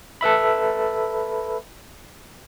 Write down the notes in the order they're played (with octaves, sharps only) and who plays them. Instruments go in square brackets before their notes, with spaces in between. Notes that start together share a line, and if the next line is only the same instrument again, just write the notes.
[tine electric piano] A4 B4 E5 B5